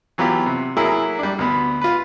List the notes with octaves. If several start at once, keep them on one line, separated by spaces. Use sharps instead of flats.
E3 F#3 B3 F4 G4
C3
F#3 A3 A#3 E4 G#4
G3 D4
D2 B3
F4 B4